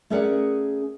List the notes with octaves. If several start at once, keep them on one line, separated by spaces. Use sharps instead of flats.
A3 C#4 G#4 A#4 D5 F#5